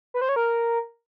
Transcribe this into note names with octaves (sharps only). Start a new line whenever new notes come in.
B4
C5
C#5
A#4